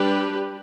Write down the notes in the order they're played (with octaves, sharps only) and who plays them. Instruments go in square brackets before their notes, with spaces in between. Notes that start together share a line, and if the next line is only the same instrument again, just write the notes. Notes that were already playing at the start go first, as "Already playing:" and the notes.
Already playing: [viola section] G3 D4 G4 B4